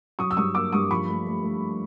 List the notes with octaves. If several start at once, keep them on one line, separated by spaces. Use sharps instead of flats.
F#3 C#6 D#6
E6
G2 C#6 D#6
A#3 D6 E6
G2 C#6 D#6
F3 B5 C#6
A3
A3
A3